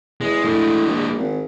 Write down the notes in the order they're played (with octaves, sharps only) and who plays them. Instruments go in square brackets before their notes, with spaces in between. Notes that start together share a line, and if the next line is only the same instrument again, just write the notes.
[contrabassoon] E2 [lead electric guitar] G#3
[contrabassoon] A2 [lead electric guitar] G#3 D4
[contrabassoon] A#1
G#1